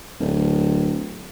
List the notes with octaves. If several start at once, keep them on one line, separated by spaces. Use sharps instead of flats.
D1